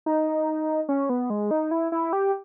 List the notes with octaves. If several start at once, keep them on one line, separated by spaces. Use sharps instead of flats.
D#4
C#4
B3
G#3
D#4
E4
E4
G4